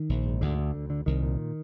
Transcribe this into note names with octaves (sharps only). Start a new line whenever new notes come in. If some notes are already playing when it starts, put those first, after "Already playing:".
Already playing: D#3
A#1
G#2
D2 D3
D3
D2
D3
C2 D#3
A#2